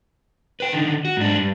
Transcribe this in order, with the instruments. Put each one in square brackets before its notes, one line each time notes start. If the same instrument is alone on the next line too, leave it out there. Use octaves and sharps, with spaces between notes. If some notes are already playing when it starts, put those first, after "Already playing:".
[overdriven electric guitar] B4 G5
D3 D#3
F#4
G#2 D4
G2